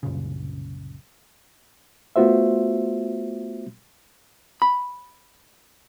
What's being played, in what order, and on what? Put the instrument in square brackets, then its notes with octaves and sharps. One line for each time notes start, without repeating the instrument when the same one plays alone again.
[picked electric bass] C2 F#2 A#2 C#3
[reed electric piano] A3 B3 F4 F#4 C5 E5
[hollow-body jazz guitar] B5